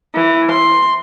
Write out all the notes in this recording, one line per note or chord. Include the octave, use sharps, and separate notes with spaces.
E3
C6